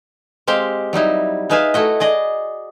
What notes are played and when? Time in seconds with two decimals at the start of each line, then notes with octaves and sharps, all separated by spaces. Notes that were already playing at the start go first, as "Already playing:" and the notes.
0.47 G#3 C4 G4 F5 G5
0.93 F#3 G3 D#4 E4
1.50 D#4 G#4 B4 E5 F5 G#5
1.74 A3 E4 F#4 D#5
2.00 G#4 D5 D#5